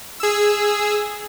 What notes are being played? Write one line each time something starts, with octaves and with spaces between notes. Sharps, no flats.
G#4 E6